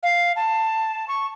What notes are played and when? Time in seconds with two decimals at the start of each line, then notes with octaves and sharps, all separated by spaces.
0.03 F5
0.36 A5
1.08 C#6